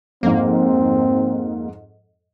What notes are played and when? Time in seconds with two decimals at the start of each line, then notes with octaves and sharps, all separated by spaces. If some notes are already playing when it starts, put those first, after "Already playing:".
0.23 F2 G#2 A#3 C4